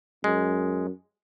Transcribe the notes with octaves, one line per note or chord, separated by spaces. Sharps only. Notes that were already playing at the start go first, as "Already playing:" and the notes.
F#2 G#3